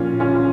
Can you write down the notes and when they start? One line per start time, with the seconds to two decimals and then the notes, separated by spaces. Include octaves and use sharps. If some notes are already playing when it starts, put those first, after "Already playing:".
Already playing: A#2 F3 C#4 F4
0.20 C#4 F4